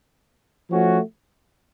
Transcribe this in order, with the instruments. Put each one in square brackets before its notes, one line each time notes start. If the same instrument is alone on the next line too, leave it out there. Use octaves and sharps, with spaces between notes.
[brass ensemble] F3 A3 C#4 F#4